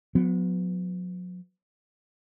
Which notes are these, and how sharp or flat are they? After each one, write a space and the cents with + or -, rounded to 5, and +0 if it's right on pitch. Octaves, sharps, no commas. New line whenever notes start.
F#3 -40 B3 +15